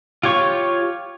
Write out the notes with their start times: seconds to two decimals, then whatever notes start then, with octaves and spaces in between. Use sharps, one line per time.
0.23 F4 G4 C#5 C#6